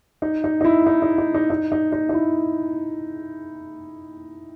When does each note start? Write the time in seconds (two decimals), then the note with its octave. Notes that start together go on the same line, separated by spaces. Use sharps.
0.22 D#4
0.44 D#4
0.61 D#4
0.65 E4
0.87 D#4
1.02 D#4
1.18 D#4
1.34 D#4
1.50 D#4
1.72 D#4
1.92 D#4
2.09 D#4
2.14 E4